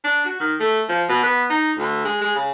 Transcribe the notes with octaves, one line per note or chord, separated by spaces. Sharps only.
D4
F#4
D#3
A3
F3
B2
B3
D#4
D2
G#3
G#3
C#3